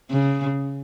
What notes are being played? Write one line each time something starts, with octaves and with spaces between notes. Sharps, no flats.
C#3